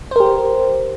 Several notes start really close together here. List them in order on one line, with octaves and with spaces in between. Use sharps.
C5 A#4 G4